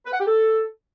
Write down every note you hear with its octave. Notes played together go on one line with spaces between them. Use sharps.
B4
F#5
G4
A4